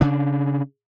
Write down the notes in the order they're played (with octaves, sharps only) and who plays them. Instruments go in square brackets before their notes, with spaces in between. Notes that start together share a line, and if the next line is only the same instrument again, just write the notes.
[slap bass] C#3 D4